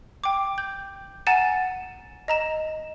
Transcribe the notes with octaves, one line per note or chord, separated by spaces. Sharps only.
G5 D6
G6
F#5 G#5 A#5 A6 D#7 E7
D#5 A#5 E7